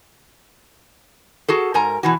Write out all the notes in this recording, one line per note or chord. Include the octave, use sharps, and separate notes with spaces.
F#4 G#4 A4
G#2 A#4 G#5 A#5
B2 E3 F#4